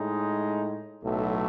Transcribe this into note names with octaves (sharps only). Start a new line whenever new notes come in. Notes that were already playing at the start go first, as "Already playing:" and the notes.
Already playing: A2 G#3 D#4
B1 A2 F#3 A3